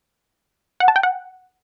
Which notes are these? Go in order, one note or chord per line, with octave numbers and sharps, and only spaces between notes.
F#5
A5
G5
F#5